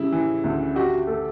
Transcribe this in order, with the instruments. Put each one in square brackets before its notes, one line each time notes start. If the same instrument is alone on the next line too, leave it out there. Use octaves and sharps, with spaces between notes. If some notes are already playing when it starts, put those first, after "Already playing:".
Already playing: [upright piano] C#3 G3 [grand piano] E4
[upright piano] E3
D2
[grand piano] F#4 [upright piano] G4
[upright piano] A3 [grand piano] A4